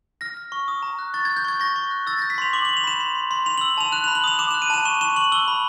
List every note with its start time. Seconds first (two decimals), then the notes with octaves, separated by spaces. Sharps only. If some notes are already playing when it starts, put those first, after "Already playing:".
0.21 F6 A#6
0.37 F6
0.52 C#6
0.68 D#6
0.83 A#5
0.99 F#6
1.14 C#6 A6
1.25 G#6
1.29 F6
1.37 G6
1.45 C#6 G#6
1.60 C#6 A#6
1.76 C#6
1.91 F#6
2.07 E6 A6
2.19 G6 A#6
2.30 B6
2.38 C6 F7
2.53 D6 F#7
2.65 F#7
2.68 D6
2.77 F7
2.84 B5 E7
3.00 C6
3.15 C6
3.31 C6
3.46 C6 F7
3.58 F#7
3.61 E6
3.78 A5 F7
3.92 F#6 E7
4.04 F7
4.07 B5
4.15 F#7
4.24 D#6 F7
4.39 D6 E7
4.51 E7
4.54 F#6
4.62 D#7
4.70 A5 E7
4.85 C#6 E7
5.01 C#6 E7
5.16 C#6 F#7
5.32 E6 G7
5.48 B5